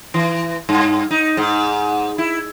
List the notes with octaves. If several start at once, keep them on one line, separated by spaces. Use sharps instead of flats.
E3
G2
D#4
G#2
E4